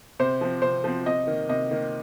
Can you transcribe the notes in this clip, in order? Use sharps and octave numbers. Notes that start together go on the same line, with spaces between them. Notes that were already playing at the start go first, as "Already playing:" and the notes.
C3 C5
F3 C4
C3 C5
F3 C4
C3 D#5
D#3 A#3
C3 D#5
D#3 A#3